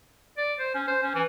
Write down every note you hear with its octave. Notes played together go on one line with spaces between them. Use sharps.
D5
C5
C#4
C5
C#4
E3